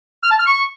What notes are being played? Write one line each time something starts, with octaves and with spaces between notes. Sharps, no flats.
F6
A5
F6
C#6